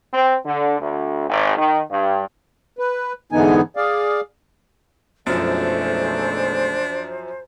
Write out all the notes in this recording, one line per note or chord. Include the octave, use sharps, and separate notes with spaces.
C4
D3
D2
G#1
D#3
G2
B4
G#2 D3 E3 B3 D#4 G#5
G#4 D5 F5
B1 F#2 F3 G#3 A3 D4 C5